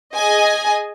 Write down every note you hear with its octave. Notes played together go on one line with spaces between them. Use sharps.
G#4 D#5 G#5